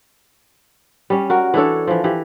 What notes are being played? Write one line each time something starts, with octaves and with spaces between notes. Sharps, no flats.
G3 C#4
F#4 A#4
E3 D4 A4 C#5
E3 F3
E3 G4